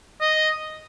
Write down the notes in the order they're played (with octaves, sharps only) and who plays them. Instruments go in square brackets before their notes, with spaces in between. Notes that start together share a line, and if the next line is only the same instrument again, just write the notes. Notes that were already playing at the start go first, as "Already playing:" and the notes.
[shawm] D#5